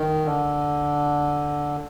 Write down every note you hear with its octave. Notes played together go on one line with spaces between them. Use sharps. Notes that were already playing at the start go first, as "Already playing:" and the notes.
Already playing: D#3
D3